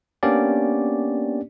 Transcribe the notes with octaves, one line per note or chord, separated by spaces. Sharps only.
A#3 B3 C#4 D4 G4 D5